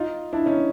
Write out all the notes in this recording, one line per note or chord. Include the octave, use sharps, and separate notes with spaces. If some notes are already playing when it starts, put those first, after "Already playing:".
Already playing: D#4 F4
D4 E4
C#4 D#4